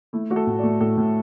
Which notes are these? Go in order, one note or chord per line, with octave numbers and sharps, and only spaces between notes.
A3 E4
A3 F#4
A4
A2
D5
A3
A2 A4
A2